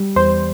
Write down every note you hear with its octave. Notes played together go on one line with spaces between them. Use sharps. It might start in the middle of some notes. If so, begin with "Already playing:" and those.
Already playing: G3
E2 C5